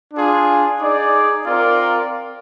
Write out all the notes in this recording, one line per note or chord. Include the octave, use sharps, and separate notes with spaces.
D4 F4 G#4
D#4 G#4 D5
C4 F4 A#4 D5